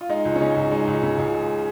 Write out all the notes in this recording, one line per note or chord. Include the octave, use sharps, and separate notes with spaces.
F4
G#3 D#4
C#2
C#4
C#3 D#4
C#2
G#3 D#4
C#2
C#3
C#2
G#3